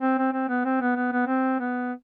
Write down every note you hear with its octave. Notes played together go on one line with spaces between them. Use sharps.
C4
C4
C4
B3
C4
B3
B3
B3
C4
B3